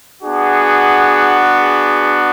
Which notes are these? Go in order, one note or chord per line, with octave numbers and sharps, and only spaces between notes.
B3 D4 F#4 G#4
G#4